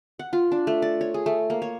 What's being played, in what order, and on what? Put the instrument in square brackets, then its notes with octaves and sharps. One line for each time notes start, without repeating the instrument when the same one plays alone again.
[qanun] F#5
F4
D4
A3
D5
C#5
G#4
A3
A#3
C#5